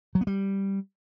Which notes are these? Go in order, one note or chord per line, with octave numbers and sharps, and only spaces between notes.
F#3
B3
G3